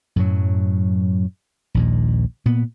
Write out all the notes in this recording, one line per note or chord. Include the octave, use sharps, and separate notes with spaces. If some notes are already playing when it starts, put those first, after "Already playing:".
F#2 A2 F#3
A#1 D#2 A#2
A#2 B3